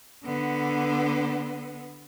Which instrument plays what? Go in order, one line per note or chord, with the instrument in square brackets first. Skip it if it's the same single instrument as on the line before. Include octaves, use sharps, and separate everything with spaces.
[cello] D3 B3